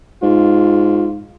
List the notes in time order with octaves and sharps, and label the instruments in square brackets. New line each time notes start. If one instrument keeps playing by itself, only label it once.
[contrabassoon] G#2 [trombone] F4